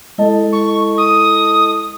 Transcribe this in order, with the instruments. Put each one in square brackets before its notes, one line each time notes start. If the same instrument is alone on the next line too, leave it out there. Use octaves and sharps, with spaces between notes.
[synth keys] G#3 D#5 A5 [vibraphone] E4 A4
[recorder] C#6
D#6